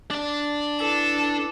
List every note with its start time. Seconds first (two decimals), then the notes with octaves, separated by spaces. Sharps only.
0.11 D4 D5
0.79 E4 A4 B4 D6